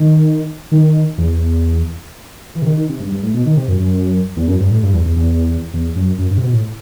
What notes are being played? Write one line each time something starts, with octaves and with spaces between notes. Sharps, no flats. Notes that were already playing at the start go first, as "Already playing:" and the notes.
Already playing: D#3
D#3
E2
E3
C3
D#3
D#3
C3
G2
G2
A2
B2
D#3
C3
F#2
F#2
E2
F#2
G2
A2
G2
E2
E2
E2
E2
F#2
F#2
G2
C3
B2
A2